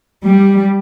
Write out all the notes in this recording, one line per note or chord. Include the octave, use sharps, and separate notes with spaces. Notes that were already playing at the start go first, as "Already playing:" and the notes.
G3